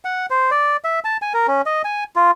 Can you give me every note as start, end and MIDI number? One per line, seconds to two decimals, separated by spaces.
0.05 0.26 78
0.30 0.50 72
0.51 0.77 74
0.84 1.00 76
1.04 1.17 81
1.22 1.33 80
1.34 1.47 70
1.48 1.62 61
1.66 1.82 75
1.85 2.04 80
2.16 2.31 65